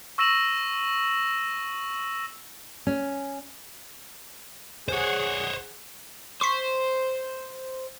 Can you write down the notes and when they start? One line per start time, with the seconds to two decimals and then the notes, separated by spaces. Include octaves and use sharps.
0.18 C#6 E6 A#6 D#7 E7 F#7
2.87 C#4
4.88 G#4 C5 C#5 F#5
6.41 C5 C#6 B6